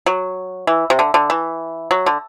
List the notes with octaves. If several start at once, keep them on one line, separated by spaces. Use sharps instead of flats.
F#3
E3
C3
D3
D3
E3
F#3
D3